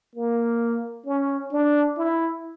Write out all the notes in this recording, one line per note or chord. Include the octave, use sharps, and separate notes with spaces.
A#3
C#4
D4
E4